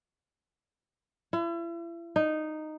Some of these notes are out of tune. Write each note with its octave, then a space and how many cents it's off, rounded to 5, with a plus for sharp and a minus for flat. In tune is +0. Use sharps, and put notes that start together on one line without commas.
E4 +40
D#4 -10